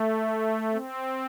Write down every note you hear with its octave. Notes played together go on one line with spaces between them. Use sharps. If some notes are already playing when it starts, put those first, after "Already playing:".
Already playing: A3
C4